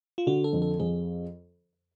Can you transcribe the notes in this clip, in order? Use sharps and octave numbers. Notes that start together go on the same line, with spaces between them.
F4
D3 F#4
A4
F2
A4
F2 G#4